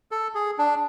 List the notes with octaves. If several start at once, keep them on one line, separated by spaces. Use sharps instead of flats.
A4
G#4
D4